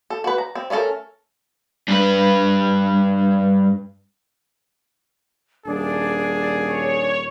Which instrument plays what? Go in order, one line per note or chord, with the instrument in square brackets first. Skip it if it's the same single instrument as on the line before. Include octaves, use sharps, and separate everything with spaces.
[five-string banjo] A4
F#4 B4
A#5
C4
A3 C#4 E4 A4 A#4
[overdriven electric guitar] G2 B4
[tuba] D#1 [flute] D4 [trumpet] G#4
[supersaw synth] C#5